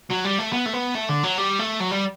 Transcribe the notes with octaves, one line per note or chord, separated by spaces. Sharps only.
F#3
G3
A3
B3
A3
B3
A3
D3
F#3
G3
A3
F#3
G3